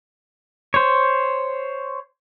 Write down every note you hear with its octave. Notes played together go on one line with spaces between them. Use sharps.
C5 C#5